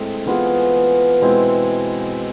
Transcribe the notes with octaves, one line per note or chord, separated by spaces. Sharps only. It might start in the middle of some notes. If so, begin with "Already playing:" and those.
Already playing: A2 G#3 C4 G#4
E3 B3 F4 G#4
B2 G#3 C4 E4